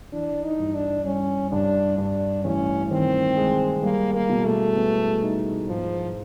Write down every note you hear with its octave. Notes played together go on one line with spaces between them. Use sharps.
E3 D4
D#4
G2
D4
G3 C#4
G2 D4
G2 D4
A1 C#4
D#3 C4
G#3
G3 A#3
A#3
B2
A3
B3
D#4
G#2 F3